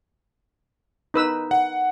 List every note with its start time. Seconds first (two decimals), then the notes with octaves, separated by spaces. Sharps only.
1.14 D#4 B4 E6
1.51 F#5